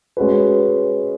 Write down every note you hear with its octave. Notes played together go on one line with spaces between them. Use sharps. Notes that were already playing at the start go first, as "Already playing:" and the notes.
G#3 C#4 F#4 B4